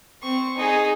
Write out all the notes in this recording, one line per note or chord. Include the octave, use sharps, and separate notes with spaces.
C4 C#6
D#4 G#4